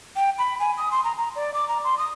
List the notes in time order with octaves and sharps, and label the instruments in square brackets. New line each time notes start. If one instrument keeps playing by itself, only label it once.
[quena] G5
B5
G#5
D#6
C6
A#5
A#5
D5
D6
A#5
C6
D#6